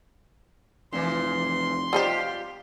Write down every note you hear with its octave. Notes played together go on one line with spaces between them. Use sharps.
F1 A#2 E3 C6
G3 D#4 F4 G4 C5